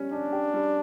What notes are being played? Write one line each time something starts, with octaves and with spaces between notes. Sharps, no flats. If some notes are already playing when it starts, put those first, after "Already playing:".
Already playing: G3 C#4
C#4 D4
G4
G3